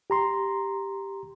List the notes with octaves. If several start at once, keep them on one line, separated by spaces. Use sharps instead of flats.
G4 A#5 C6